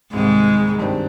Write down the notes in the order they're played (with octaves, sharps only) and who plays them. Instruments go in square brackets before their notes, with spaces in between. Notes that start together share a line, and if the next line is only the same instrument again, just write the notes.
[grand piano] C2 C3 D#3 [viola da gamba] G#2 G#3
[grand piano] G2 D#3 G3 C4